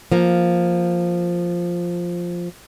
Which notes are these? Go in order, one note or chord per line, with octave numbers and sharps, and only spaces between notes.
F3 A#3